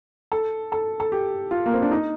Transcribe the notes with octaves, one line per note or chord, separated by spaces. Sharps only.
A4
A4
A4
G4
F4
A#3
C4
D4
D#4